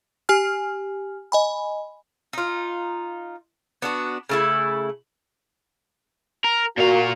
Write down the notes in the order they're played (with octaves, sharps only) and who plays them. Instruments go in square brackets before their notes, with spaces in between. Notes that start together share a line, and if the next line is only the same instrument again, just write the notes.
[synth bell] G4 G#5 F6
D#5 G#5 B5
[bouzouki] D#4 F4
B3 D4 F#4
C#3 A3 E4
[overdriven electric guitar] A#4
[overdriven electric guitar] A#2 F5 [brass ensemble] F#4 A#4